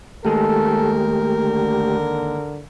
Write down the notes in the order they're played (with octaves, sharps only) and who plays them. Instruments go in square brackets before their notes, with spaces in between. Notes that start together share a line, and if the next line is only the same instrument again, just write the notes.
[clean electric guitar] D#2 G#3 [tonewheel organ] A3 G4 [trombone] A4 [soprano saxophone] A#4
[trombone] D3